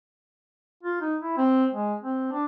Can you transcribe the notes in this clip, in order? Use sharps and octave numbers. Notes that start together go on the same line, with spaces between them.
F4
D#4
E4
C4
G#3
C4
D4